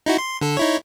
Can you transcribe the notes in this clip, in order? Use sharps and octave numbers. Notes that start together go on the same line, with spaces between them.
D#4 E4 F#4
C6
D3 A4
D#4 E4 C#5